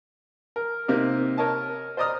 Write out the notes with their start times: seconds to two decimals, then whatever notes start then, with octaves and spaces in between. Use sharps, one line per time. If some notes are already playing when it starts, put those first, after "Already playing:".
0.56 A#4
0.88 C3 A#3 C4 D#4
1.38 A#4 C#5 D#5 A5
1.97 C5 D5 D#5 A#5 D#6 F6